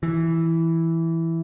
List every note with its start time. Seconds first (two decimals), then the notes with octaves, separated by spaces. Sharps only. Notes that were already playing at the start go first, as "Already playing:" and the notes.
0.03 E3